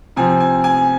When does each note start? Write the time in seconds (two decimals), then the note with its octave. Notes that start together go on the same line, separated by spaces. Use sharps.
0.16 C3 F3 C4 G#5
0.40 G#5
0.64 G#5